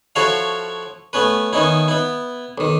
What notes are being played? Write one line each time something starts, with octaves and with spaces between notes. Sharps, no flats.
F3 E4 F#4 A4 C#5 F5
A3 B3 C#4 B4
D#3 B3 C#4 D#4 E4
B3 E4
B1 D#3